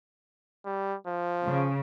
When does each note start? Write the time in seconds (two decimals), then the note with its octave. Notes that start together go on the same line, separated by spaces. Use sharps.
0.65 G3
1.07 F3
1.44 C#3